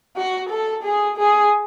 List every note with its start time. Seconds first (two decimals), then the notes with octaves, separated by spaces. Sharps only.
0.17 F#4
0.50 A4
0.84 G#4
1.17 G#4